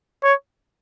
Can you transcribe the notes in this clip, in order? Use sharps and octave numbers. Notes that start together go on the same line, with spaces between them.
C#5